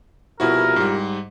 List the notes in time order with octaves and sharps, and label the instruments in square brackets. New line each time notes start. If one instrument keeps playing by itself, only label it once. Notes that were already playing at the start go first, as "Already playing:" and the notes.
[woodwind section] C2 F3 A#4 [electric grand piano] B2 E4 F#4
[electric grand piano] G#2 G3